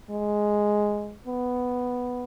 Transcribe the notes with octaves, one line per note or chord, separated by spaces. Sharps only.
G#3
B3